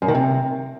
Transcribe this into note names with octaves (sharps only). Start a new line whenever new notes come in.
F#2
D#3
C3